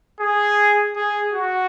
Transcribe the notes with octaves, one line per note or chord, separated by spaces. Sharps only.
G#4
G#4
F#4